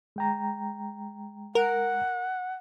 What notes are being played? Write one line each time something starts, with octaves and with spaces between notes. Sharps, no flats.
G#3 G5 A#5
A#4 F#5